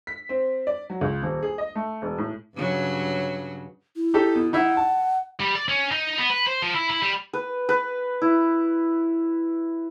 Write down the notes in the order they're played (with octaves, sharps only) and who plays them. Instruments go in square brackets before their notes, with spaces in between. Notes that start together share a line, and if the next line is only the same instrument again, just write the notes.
[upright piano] B6
C4
D5
F#3
C#2
D#1
G#4
D#5
A3
E1
A2
[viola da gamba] G2 C#3 F#3
[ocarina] E4
[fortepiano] D#4 G4 A4
B2
[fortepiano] D#4 E4 E5 [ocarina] F#5
[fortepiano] A5
[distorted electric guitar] G3
D5
C#4
D#4
B3
B4
C5
F3
E4
E4
G3
[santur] B4
B4
E4